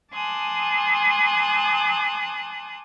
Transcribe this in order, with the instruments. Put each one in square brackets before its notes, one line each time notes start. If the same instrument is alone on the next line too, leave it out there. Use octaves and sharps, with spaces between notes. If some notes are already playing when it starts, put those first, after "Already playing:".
[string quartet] G#5 A5 C6 D6 D#6 F#6